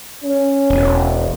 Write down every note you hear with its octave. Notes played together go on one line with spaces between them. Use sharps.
C#4
E1